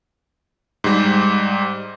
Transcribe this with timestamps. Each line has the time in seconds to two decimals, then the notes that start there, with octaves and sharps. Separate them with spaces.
0.84 G#2 G3